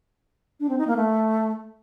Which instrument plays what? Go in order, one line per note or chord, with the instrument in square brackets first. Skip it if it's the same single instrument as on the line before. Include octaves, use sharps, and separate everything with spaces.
[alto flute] D4
C4
D#4
A#3
A3